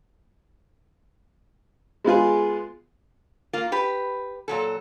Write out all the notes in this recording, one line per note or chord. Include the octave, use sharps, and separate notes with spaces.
G#3 B3 F4 G#4
A#3 F4
G4 B4
A#2 F#3 A4